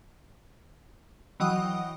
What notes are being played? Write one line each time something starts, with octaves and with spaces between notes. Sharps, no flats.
E3 F#3 D#5 F#5 G5 D#6